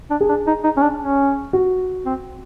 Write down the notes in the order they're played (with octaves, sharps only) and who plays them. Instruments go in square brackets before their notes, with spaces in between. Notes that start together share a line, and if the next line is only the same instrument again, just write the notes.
[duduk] D4
[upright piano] G#4
[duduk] D4
D#4
D#4
C#4
D4
C#4
[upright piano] F#4
[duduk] C4